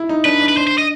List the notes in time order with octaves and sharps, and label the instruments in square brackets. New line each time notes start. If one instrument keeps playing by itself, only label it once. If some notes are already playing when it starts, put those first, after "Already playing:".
Already playing: [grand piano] E4
D#4
[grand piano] D4 [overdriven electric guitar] B4
[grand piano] D4
[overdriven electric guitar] B4
[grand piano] D4 [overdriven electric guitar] C5
[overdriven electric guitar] C5
D#5